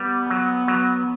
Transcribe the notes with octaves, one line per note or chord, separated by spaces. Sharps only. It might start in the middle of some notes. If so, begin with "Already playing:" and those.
Already playing: G3 B3
F#3
F#3